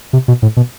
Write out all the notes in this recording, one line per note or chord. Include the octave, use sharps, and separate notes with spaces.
C3
B2
A2
B2